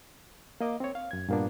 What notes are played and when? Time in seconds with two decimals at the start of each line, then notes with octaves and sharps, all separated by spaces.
0.61 A#3 D#5 D6
0.80 C4 C#5
0.95 F5
1.11 F#2 G#6
1.29 G2 A#2 A#3 B3 D4